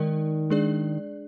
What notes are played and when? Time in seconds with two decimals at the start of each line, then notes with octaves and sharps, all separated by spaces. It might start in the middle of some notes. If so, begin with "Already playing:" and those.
Already playing: D#3 G#3 D#4 A#4 D5
0.50 G#3 D4 G#4 D5